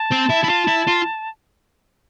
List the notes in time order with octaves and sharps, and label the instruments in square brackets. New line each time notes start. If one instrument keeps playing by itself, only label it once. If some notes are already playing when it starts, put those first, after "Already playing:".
Already playing: [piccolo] A5
[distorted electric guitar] C4
E4
E4
F4
E4
F4